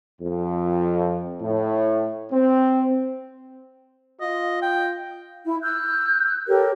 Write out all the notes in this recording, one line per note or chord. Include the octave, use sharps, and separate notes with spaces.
F2
A2
C4
F4 D#5
G5
E4
E6 F#6 G6
G4 A4 A#4 C#5